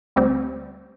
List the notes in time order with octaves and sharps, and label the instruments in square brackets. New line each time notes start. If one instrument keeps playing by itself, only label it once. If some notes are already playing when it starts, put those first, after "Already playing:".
[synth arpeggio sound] D2 G3 C4